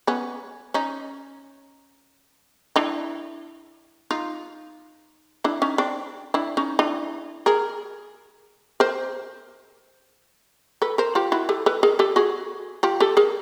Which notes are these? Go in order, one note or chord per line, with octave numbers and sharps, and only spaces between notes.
B3 C#4
C#4 D#4
D4 E4
D#4 F4
D4 E4
C#4 D#4
C4 D4
D4 E4
C#4 D#4
D4 E4
G#4 A#4
A#4 C5
A4 B4
A#4 C5
F4 G4
E4 F#4
G4 A4
A4 B4
G#4 A#4
G4 A4
F#4 G#4
F4 G4
G4 A4
G#4 A#4